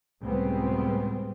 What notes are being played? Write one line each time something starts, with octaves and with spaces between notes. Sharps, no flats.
C#2 A2 C3 G3 B3 C4